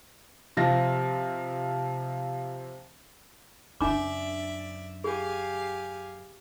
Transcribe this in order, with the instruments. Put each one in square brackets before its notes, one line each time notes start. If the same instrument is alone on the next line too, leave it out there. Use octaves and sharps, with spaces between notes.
[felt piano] C3 F3 A#6
[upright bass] F#2 C#3 [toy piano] D4 D6 [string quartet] D5 E5
[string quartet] G4 F5 G#5 [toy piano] G#4